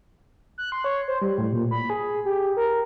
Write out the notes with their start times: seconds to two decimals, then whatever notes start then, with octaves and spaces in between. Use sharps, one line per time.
0.58 F#6
0.72 C6
0.84 C#5
1.08 C5
1.22 G3
1.38 A2
1.52 A#2
1.71 B5
1.90 G#4
2.25 G4
2.57 A#4